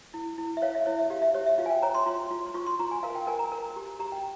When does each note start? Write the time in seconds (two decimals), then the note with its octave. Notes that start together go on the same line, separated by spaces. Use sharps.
0.14 E4
0.38 E4
0.57 E5
0.62 C#5 F5
0.75 E5
0.86 E4 C#5
0.99 E5
1.10 G4 F5
1.22 E5
1.34 G4 C#5
1.46 E5
1.58 F4 F5
1.66 G#5
1.70 G5
1.82 C#5 A#5
1.94 C6
2.06 F4 C6
2.31 F4
2.46 C6
2.54 F4 C#6
2.66 C6
2.79 F4 A#5
2.91 G#5
3.03 A#4 F5
3.15 G5
3.27 A#4 G#5
3.39 A#5
3.52 A#4
3.76 G4
4.00 G4 A#5
4.12 G5